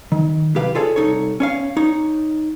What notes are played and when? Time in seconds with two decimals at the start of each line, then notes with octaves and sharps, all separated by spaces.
0.12 D#3
0.55 B1 C3 G4 B4 F5
0.75 F4 G#4 A4 C#5
0.96 C2 D#4 A4 C#5
1.40 C#4 C#5 F5
1.77 D#4 C#5